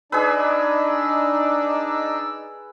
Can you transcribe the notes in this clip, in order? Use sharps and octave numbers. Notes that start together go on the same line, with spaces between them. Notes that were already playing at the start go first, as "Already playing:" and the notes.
D4 D#4 G#4 B4 D5 E6